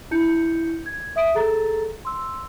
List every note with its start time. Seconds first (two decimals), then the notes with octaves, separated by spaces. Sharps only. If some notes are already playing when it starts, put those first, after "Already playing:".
0.11 D4 E4 G6 C#7
0.86 G#6
1.16 E5 D#6 D7
1.35 G#4 A4 A#5 A6
2.05 C6 E6